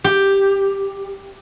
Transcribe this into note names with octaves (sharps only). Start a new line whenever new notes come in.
G4